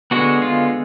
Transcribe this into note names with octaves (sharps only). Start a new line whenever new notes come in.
D3 G#3 B3 F#4
F4